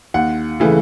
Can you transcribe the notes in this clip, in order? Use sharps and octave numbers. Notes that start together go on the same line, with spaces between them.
D#2 F#5
C#3 E3 A3